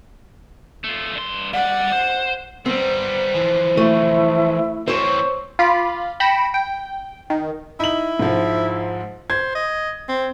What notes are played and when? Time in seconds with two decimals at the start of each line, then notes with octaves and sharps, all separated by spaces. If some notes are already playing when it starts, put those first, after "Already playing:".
0.84 A3 F4
1.15 G2 C6
1.53 G3 D5 F#5
1.92 C5
2.66 G3 B3 C4 C5
3.34 E3 F3
3.77 A3 E4
4.88 E3 C4 C5 C#5
5.59 F4 B5 D6
6.20 G5 B5 A#6 C#7 E7
6.54 G5
7.30 D#3
7.80 D#4 E4 F#7
8.19 G#2 F3
9.30 C5 G#6
9.55 D#5
10.09 C4